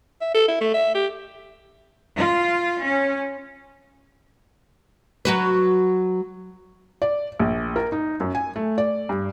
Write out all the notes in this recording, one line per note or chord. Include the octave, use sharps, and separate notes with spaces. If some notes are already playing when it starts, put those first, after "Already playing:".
E5
A4
E4
A3
E5
G4
F4
C#4
F#3 F#4 B4
D5
A#1
A#4
D#4
F#2
G#5
A3
D5
G2